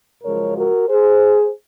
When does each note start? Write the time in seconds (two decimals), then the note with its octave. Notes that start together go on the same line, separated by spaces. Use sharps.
0.23 F#2 C#3 F3 G#3 A#4 C#5
0.56 F#4 A#4
0.88 G#4 C5